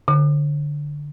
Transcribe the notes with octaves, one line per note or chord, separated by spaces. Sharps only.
D3